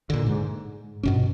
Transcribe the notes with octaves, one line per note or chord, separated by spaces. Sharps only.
A#2 D3
G#2
G2 B2 C#4